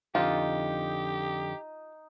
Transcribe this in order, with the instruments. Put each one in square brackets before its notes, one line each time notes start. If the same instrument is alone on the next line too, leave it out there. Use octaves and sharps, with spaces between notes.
[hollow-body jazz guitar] F2 D3 C5 [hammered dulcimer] D#4 [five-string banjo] F4 [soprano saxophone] G4